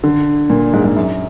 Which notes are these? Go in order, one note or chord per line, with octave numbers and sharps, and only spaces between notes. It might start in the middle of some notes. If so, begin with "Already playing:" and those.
D3
A#2
G#2
G#2
F#2